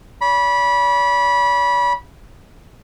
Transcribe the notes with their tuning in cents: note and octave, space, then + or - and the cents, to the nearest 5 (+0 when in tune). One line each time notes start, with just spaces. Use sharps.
D5 -45 B5 -20